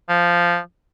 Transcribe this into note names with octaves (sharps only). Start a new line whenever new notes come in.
F3